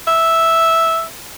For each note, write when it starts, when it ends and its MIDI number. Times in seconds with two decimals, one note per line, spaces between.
0.07 1.03 76